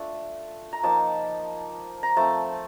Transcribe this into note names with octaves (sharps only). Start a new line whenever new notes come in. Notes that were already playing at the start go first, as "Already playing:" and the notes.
Already playing: A3 D4 F4 A5
A#5
F3 A#3 D#4 A5
A#5
F3 A3 C4 A5